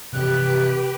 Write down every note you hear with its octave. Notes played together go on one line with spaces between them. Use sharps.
C3 E3 F3 G4 B4 F#6